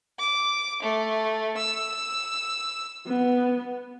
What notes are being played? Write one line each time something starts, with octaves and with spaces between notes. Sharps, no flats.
D6
A3
E6
B3